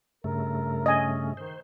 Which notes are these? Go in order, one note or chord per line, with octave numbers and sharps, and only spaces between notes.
G2 C#3 A3 A#4
C#4 D#5 G#5
D#3 C5